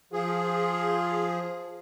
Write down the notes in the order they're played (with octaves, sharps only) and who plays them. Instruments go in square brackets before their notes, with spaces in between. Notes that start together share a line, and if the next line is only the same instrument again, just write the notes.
[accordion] F3 G#4 [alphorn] F4